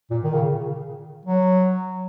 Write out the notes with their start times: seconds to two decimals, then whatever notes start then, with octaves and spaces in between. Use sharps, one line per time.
0.11 A#2
0.24 D#3
0.33 C#3
1.25 F#3